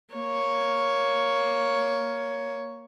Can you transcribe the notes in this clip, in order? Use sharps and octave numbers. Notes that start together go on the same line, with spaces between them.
A#3 C#5